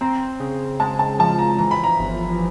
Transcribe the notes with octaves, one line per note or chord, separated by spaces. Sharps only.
C4 A#5
C#3
G#3 A5
A5
F3 A5
A#5
E3 A#5
B5
A#5
G1